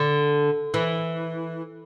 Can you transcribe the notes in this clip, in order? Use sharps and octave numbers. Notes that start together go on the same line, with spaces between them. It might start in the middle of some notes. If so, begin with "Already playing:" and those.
Already playing: D3
E3